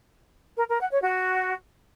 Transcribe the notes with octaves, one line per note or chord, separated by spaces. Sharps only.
A#4
A#4
F#5
C#5
F#4